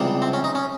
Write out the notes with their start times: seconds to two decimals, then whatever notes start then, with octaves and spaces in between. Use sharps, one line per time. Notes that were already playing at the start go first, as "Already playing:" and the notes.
Already playing: C#2 C3 E3 G3
0.22 C4
0.33 C#4
0.44 D#4
0.55 C#4